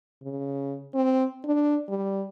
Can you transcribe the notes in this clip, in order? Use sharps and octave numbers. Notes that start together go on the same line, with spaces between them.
C#3
C4
D4
G3